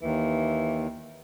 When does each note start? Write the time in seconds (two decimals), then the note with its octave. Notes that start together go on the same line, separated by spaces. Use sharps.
0.01 D#2 E3